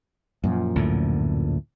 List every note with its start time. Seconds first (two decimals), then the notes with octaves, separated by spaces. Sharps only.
0.44 F#2 A#2 F3
0.76 D2 A2 D3